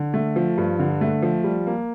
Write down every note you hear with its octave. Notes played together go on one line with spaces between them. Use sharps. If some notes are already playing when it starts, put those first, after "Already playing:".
Already playing: D3
A3
F3
G2
D3
A3
F3
G3
A#3